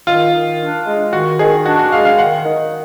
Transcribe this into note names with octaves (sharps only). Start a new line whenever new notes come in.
D#3 F4
D#3
D4
G#3
D#3 F#4
D#3 G#4
D4 F#4
F#4
G#3 F5
F5
D#3 F#5
D#3